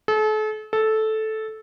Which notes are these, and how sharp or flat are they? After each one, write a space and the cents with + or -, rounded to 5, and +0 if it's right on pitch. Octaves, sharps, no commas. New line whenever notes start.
A4 -40
A4 -10